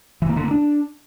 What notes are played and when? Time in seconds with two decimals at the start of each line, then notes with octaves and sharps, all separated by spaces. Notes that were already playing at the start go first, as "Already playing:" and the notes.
0.22 E3
0.29 A#3
0.36 D3
0.44 A#3
0.51 D4